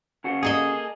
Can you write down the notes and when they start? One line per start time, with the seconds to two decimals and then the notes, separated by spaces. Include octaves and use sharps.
0.24 C#3 F#4
0.43 A#3 G#4 A4 D#5